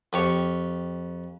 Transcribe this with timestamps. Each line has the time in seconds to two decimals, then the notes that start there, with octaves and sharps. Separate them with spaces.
0.13 F2 G4 C#5